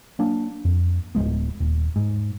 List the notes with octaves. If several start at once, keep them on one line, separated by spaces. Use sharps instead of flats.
F#3 A#3 D4
F2
D1 G2 G#3 B3
D#1
G#2